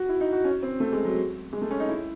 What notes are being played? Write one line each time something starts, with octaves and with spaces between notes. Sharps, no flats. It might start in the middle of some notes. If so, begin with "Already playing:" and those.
Already playing: F#4
E4
D#4
F#4
C#4
C4
A3
G#3
F#3
G#3
A3
C#4
D#4
E4